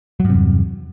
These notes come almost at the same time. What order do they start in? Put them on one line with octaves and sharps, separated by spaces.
F#3 G2 C3 E2